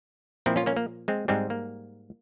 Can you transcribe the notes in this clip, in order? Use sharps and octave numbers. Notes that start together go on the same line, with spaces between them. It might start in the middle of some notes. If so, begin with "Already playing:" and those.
A#2 F3 C4 E4
C#4 F4
A#3 C#4
A#3
G#3 C4
G#2 G3 G#3 C4
A#3